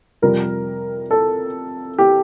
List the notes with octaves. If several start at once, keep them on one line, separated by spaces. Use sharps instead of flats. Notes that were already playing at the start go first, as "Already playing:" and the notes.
F2 C3 G3 A#4
A4
G4